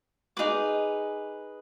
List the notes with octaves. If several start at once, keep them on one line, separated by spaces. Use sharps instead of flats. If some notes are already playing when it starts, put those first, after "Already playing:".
D#4 G#4 B4 D6